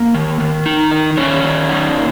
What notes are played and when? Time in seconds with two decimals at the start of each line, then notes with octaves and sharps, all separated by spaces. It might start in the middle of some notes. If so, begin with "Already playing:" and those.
Already playing: A#3 A#4
0.14 D#3
0.40 D#3
0.66 D#4
0.91 D#3
1.17 D#3 C#4 C#5
1.43 D#3
1.69 D#4
1.95 A#2